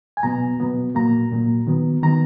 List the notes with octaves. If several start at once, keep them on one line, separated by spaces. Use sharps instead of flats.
G#5
B2 F#3 B3 A#5
B2 F#3 B3
A#2 F#3 A#3 A#5
A#2 F#3 A#3
D#3 F#3 B3
D#3 F#3 B3 A#5